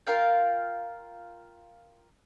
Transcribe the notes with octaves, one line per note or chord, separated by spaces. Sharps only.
F4 A#4 F5 G5